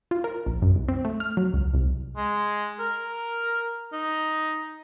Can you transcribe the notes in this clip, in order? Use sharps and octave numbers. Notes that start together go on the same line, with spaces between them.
F4
A#4
A#1
F#2
C2
C4
A3
F6
F#3
C#2
C2
G#3
A#4
D#4